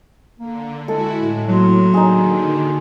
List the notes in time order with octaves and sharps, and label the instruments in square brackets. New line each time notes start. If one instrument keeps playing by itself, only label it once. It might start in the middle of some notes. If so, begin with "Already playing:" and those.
[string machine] D3 [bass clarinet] A#3
[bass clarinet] G#3 [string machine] E4 F#4 [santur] A4
[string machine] A2
[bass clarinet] F#3 [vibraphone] A#3 F#4 C6
[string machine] D3 D#3 [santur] D#4 G#4